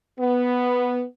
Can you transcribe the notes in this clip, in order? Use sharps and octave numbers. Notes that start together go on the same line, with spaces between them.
B3